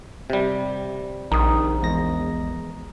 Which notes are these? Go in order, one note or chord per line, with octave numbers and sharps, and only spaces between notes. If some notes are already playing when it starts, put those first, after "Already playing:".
C3 G3
A#1 D#3 A#5 D#6
E2 G#3 A#6